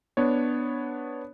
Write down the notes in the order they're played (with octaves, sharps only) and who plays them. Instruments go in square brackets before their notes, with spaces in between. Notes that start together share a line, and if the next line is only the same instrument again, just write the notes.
[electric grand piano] B3 D4 C#5